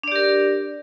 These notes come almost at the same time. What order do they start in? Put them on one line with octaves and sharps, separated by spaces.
D4 D5 G4 A#4